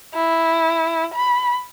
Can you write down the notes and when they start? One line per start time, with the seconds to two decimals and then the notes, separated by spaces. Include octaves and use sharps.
0.14 E4
1.14 B5